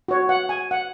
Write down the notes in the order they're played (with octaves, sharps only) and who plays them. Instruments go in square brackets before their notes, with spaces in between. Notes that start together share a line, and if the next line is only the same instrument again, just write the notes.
[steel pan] F#4 C#5
F#5
G#5
F#5